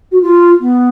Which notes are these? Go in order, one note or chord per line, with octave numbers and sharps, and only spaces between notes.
F#4
F4
B3